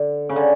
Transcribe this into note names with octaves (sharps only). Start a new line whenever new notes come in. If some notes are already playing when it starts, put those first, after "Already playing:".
Already playing: D3
C#3
D3